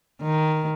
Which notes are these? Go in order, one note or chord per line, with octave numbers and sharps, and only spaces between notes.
D#3